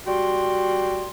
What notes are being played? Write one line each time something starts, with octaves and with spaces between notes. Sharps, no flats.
G3 F#4 G5 C6